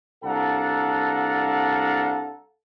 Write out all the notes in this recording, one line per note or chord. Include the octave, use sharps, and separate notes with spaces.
C2 D4 A4 F5 F#5 A#5